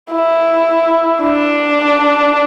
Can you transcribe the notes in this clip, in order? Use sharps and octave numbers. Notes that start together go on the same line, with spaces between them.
E4
D4